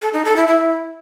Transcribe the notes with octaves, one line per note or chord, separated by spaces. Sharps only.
A4
D#4
A4
E4
E4